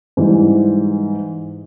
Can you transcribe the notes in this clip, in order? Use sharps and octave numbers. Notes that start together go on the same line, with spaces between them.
G#2 E3 G3